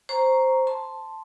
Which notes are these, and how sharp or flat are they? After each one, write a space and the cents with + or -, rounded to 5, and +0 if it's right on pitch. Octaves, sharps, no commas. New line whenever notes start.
C5 +0 A#5 +0 C#6 +0
A5 +0 C6 +0